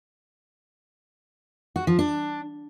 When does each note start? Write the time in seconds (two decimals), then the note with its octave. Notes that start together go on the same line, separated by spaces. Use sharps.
1.76 F#4
1.87 F3
1.99 D4